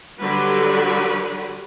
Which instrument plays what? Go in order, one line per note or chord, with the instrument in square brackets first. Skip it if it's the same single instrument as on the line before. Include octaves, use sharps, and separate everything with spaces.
[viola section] D3 F#3 G3 F#4 G4 B4